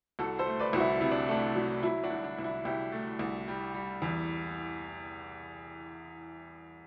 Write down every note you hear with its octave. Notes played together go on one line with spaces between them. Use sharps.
C2 F#4 A4
A4 C5
A3
B4 D5
C2 F#4
E4
C3 E4
D4
A3 D4
F#3
F#3 E4
D4 F#4
C2
D4
C2
E4
C2 E4 G4
A3
C2
G3
G3
E2